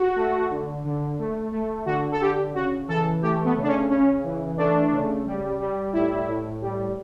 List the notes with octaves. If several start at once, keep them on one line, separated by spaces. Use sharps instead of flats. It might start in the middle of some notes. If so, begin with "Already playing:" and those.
Already playing: F#4
A3
D3
D3
A3
A3
D3 F#4
A4
D3 G4
C#3 F#4
E3 A4
A3 G4
B3
C#3
D4
C#4
C#3 C#4
E3
A3 D4
C#3
G3
G3
A2 E4
A2
G3